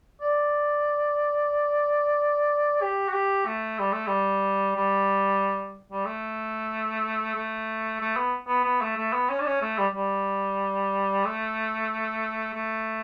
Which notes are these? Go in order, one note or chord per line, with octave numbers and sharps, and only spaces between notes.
D5
G4
F#4
G4
A3
G3
A3
G3
G3
G3
A3
A3
A3
B3
B3
B3
A3
A3
B3
C#4
D4
C#4
A3
G3
G3
A3
A3